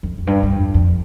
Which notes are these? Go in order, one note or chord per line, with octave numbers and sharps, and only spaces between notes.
F2
F2
G2
G2
F2
F2